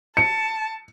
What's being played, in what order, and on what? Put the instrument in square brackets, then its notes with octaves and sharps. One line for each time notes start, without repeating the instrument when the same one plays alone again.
[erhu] A5 [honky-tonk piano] C#7